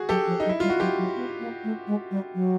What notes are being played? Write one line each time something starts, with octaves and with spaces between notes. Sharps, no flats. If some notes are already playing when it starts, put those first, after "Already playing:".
Already playing: F#4 G#4
F#3 G4 A4
F3
D#4
F#3
E4
G3 F4
F#4
F#3 F4 G4
F#3
B3
A#3
A3
G#3
G3
F#3